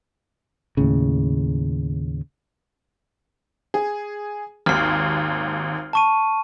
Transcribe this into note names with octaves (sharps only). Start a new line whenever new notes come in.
D#2 A2 C#3
G#4
G#1 D#2 F6 C7
A5 C#6 D#7